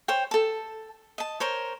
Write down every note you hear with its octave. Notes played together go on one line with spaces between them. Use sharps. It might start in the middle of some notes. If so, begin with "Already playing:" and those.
C5 C#5 G5
A4 A5
D#5 A5
A#4 C5 C#5